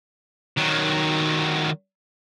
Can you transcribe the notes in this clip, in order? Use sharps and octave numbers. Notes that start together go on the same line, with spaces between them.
D#3 F#3